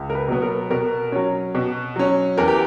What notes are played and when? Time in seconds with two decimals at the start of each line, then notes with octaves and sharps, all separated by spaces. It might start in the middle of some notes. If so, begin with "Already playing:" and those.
Already playing: C#2
0.10 A#4
0.15 B4
0.28 B2 F#3 B3
0.42 A#4
0.71 B2 A#4
1.12 F#3 C#4
1.55 B2
1.96 F#3 C#4
2.38 E2 A#4
2.47 G4